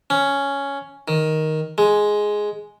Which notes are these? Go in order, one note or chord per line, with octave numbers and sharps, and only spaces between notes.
C#4
D#3
G#3